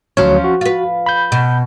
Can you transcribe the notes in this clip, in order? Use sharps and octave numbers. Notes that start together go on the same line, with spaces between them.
D2 F3 F#3 C#4 C#5
F#4
F4 B4
B5 G6
B2